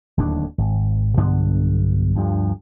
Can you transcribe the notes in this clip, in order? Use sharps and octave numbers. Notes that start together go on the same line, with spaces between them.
D1 D#2 A2 D4
G#1
B1 G2 D3 B3
D2 G2 F3